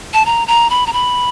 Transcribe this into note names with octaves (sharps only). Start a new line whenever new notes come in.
A5
A#5
A#5
B5
A#5
B5